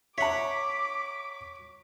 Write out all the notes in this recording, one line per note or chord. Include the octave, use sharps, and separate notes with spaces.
C#5 E5 F#5 A#5 D6 B6